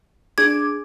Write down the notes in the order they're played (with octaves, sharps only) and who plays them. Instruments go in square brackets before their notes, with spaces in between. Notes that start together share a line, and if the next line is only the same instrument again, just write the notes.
[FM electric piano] D4 G#4 D6 [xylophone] G#6